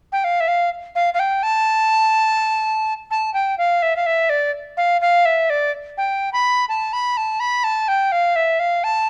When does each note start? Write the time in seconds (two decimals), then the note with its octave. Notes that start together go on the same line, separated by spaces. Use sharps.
0.12 G5
0.24 F5
0.40 E5
0.48 F5
0.95 F5
1.14 F5
1.19 G5
1.43 A5
3.11 A5
3.34 G5
3.58 F5
3.82 E5
3.96 F5
4.06 E5
4.30 D5
4.77 F5
5.01 F5
5.25 E5
5.50 D5
5.98 G5
6.33 B5
6.69 A5
6.93 B5
7.17 A5
7.40 B5
7.64 A5
7.88 G5
8.12 F5
8.36 E5
8.60 F5
8.84 A5